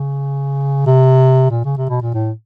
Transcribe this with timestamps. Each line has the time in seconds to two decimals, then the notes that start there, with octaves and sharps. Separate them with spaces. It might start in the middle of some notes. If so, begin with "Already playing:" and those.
Already playing: C#3
0.86 C3
1.50 A#2
1.65 C#3
1.77 C3
1.89 B2
2.02 A#2
2.14 A2